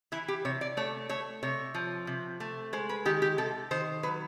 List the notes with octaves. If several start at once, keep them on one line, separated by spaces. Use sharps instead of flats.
E3 E4
G4
C3 C#5
D5
A3 C#5
A3 C#5
C3 C#5
F3
C3
A3
G#3 C5
B4
D#3 G4
G4
C3 A4
D#3 C5
F#3 B4